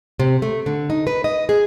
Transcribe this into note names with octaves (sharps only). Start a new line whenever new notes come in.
C3
A3
D3
D#4
B4
D#5
G#4